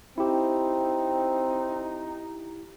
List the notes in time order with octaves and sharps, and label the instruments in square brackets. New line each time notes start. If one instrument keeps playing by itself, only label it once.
[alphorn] C4 [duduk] D#4 [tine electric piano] E4 G4